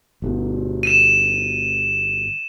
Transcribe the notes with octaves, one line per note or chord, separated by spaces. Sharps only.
G1 B2
D#7 E7